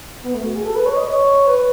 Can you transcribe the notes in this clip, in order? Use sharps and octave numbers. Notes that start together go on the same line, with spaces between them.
B3
A3
F#4
G#4
A4
B4
C#5
D#5
C#5
B4